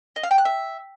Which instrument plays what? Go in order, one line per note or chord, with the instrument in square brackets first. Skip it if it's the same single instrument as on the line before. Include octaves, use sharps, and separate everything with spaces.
[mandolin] D#5
F5
G5
F#6
E5